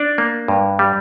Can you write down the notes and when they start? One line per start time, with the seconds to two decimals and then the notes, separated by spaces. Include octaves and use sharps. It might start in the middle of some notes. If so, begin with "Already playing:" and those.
Already playing: D4 D5
0.18 A#3
0.48 G2
0.79 G3